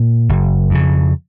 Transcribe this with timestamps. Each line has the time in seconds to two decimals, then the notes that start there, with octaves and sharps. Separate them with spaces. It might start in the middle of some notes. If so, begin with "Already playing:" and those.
Already playing: A#2
0.29 F#1
0.70 F2 C#3